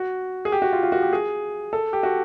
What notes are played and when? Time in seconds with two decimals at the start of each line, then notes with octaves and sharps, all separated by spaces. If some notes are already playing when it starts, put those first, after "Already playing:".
Already playing: F#4
0.45 G#4
0.52 G4
0.62 F#4
0.73 F4
0.83 F4
0.92 F#4
1.02 G4
1.13 G#4
1.73 A4
1.93 G4
2.03 F#4